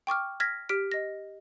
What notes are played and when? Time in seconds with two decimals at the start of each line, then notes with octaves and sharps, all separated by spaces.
0.07 G5 C#6 D6 F6
0.40 F6 G#6 A#6 B6
0.69 G4 F6 B6 D7
0.92 D#5 A#6